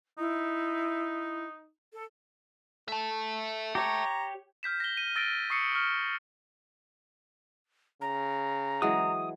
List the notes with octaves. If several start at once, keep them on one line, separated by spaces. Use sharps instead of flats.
D#4 E4
A4
A3 E5 A5
G4 C#5 A#5
F6 G6 B6 E7
A#6 G7
D#7
E6 A6 A#6 D7 G7
C#6 D#6 C7 C#7
C#6 F6
C#3 A#5
E3 F#3 G#3 D#6